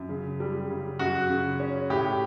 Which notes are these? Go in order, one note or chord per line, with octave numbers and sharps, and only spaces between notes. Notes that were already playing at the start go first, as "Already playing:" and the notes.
Already playing: F#2
C#3
G3
C#3
F#2 F#4
C#3
C#4
A2 G4